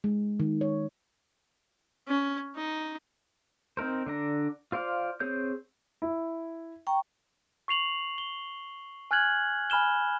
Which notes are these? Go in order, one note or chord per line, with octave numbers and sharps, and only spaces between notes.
G#3
D#3
C#5
C#4
D#4
C4 D#4 A#4 C5
D3 D4 A#5
F4 C5 D5 F5
C4 G#4 C#5 G6
E4
G5 A#5 C#6
C#6 C7 F7 F#7
G7
G#5 F6 F#6 G#6 F#7
G#5 B5 F6 E7 G7